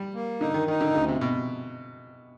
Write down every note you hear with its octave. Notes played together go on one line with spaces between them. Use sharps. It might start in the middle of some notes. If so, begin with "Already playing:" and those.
Already playing: G3
A#3
D3 D#4
D#3
D#3 D#4
D3
D2 C#3
C3
B2